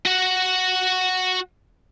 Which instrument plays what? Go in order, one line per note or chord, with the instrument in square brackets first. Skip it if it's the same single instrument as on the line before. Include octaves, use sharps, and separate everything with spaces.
[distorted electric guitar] F#4 F#5